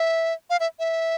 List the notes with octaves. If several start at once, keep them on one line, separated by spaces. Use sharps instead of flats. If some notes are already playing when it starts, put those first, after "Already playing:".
Already playing: E5
F5
E5
E5